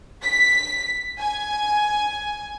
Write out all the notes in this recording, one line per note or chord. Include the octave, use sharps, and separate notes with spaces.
B6
G#5